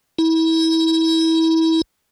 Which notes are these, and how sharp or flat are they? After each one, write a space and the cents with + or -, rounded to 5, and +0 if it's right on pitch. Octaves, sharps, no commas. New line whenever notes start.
E4 -30